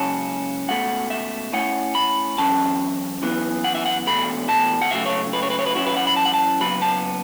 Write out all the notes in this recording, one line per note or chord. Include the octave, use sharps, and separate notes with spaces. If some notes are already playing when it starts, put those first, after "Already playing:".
Already playing: C#2 C#3 F#3 C#4 A5
C#2 B2 A3 F#5
E5
A2 A3 C#4 F#5
B5
F#2 E3 C#4 A5
F#2 E3 B3
F#5
E5
F#5
E2 B2 A3 B5
A5
F#5
C#3 F#3 A3 E5
C#5
B4
C#5
B4
C#5
B4
F#2 E3 C#4 E4 F#4
B4
F#5
B5
A5
F#5
A5
C#3 F#3 B3 B5
A5